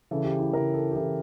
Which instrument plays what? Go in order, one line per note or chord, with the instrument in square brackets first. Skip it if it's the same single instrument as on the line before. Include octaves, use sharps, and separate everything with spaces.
[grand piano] C#3 E3 A4
G4
E4
C#3 E3 A#4
A4
G4
C#3 E3 A4